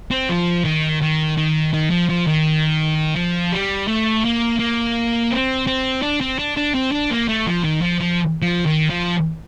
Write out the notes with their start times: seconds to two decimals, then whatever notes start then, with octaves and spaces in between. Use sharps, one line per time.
0.11 C4
0.29 F3
0.65 D#3
1.02 D#3
1.37 D#3
1.73 D#3
1.90 F3
2.09 F3
2.27 D#3
3.16 F3
3.52 G3
3.87 A3
4.24 A#3
4.60 A#3
5.31 C4
5.67 C4
6.02 D4
6.21 C4
6.39 D4
6.57 D4
6.75 C4
6.92 D4
7.11 A#3
7.28 A3
7.47 F3
7.64 D#3
7.82 F3
8.00 F3
8.42 F3
8.66 D#3
8.90 F3